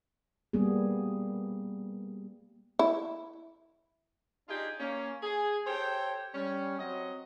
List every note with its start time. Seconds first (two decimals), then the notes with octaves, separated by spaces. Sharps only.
0.53 G3 A#3 B3 G#4
2.79 E4
4.49 D4 D#4 F4 G4 G#4
4.80 A#3 C#4
5.23 G#4
5.67 G4 A4 C5 C#5 G5
6.34 G3 C#4
6.79 F#3 C4 D#5